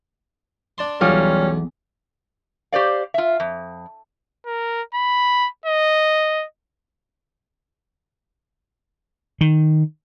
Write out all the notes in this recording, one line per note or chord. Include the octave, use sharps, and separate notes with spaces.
D4 A5 C6
B1 E2 G3 C#4 F4
G4 C5 D5 F5
F4 E5
F2
A#4
B5
D#5
D#3